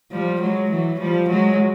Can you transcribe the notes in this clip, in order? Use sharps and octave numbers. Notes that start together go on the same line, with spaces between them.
F3 G3
F#3 G#3
E3 F#3
F3 G3
F#3 G#3